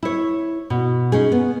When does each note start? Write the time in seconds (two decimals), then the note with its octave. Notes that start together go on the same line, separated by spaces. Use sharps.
0.03 E4 C#5
0.70 B2
1.12 C#4 D#4 G#4
1.32 B3